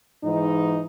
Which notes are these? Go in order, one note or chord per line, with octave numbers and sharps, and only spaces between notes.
G#2 E3 D#4